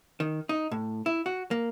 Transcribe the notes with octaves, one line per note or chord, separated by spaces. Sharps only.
D#3
D#4
A2
E4
F#4
A#3